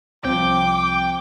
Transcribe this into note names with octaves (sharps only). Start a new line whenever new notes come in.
C2 F3 C4 G5 D6